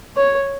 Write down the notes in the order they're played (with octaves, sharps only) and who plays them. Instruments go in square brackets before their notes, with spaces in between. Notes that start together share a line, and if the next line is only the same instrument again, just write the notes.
[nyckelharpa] C#5